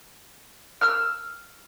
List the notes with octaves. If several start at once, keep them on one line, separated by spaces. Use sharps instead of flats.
E6 F6